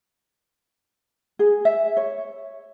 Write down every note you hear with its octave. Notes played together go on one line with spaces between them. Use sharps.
G#4
E5
C#5